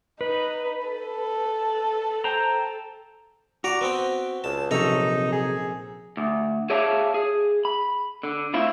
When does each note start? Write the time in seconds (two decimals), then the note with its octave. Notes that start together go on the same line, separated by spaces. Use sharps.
0.21 D#4 B4
0.87 A4
2.24 C5 G5 A#5
3.64 F#4 D5 A#5
3.81 B3 C4 G5
4.44 C#2 A5
4.71 A#1 C3 F#3 C#4 D#4 A4 A#5
5.32 G#4
6.17 D2
6.70 G#4 C#5 D5 E5 F5 A5
7.14 G#4
7.65 B5
8.23 D3
8.54 A2 C4 E4 F4